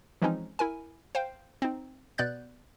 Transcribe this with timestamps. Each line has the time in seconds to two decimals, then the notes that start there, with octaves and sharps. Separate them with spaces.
0.22 E3 F3 G#3 C4 C#4 D#4
0.59 E4 A#4 G#5
1.15 C5 F5 G5
1.62 C4 D#4
2.18 B2 B3 D5 F#6 G6 A6